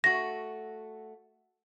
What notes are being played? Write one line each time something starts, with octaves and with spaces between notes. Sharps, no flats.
A3 F#4 A#6